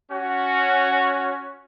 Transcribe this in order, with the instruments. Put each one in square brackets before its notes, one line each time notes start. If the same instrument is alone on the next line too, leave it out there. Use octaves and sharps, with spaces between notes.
[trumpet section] C#4 F#4